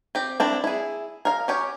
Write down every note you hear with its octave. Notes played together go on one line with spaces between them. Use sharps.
C4 G4
C4 D4 E4
E4 G#4
A#4 F5
C#4 G4 C#5